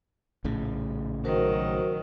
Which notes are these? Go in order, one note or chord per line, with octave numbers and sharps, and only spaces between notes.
A#1 A2 C#3
D#3 F#3 F#4 A#4 C5